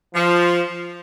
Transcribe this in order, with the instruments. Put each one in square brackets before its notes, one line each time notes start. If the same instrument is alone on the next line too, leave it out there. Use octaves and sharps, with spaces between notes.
[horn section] F3